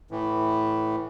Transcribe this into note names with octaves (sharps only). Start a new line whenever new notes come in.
A2 E3